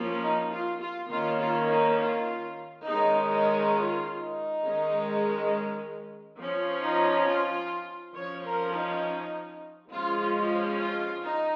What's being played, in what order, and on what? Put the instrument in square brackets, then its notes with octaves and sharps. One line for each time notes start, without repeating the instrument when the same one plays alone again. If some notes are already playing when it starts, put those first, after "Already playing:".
Already playing: [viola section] F3 A#3 C#4
D#4
F4
F4
D#3 A#3 C#4 F4
F4
D#4
F4
D#3 G#3 C#4 D#4
D#4
F4
D#4
D#3 G#3 C#4
F3 C#4
D#4
F4
F3 C#4 C#5
A#4
D#4
F3 G#3 C#4 F4
F4
F4
D#4